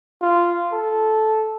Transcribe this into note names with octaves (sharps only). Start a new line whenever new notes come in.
F4
A4